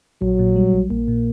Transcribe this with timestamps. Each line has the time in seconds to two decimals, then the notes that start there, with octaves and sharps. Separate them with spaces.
0.21 A#1 F#3
0.39 A#2
0.56 G3
0.73 A#1
0.90 A#1 A#3
1.08 A#2